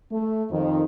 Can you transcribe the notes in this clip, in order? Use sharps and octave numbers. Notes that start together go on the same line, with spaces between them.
A3
F2 D#3